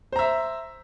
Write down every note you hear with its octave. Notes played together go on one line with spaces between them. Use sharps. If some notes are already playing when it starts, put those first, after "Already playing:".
C5 E5 A#5